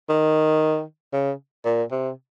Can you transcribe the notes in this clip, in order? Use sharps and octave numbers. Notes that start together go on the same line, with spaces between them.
D#3
C#3
A#2
C3